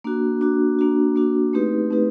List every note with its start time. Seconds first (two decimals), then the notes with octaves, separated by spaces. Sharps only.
0.04 A#3 D4 F#4
0.41 A#3 D4 F#4
0.79 A#3 D4 F#4
1.16 A#3 D4 F#4
1.53 A3 C4 D#4 G4 B4
1.91 A3 C4 D#4 G4 B4